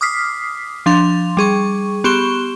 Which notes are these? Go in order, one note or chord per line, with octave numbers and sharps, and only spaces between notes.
D6 D#6 F6 B6 C7
F3 D4 C6 F7
G3 G#4 C#6
B3 G4 C6 C#6 E7 G7